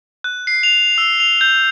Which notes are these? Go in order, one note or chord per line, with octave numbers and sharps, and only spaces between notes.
F#6
C7
F7
E6
F7
G6